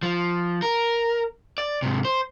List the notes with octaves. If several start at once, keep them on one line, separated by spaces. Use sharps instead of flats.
F3
A#4
D5
G#2 C3
C5